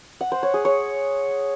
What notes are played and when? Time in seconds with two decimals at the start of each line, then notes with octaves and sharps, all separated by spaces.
0.21 F#5
0.32 C5
0.43 C#5
0.54 G#4
0.65 C#5